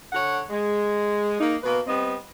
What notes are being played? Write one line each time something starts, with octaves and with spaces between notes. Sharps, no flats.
D3 C#5 F#5
G#3
A#3 D#4
B2 A#3 B4
G3 B3 C4 D#5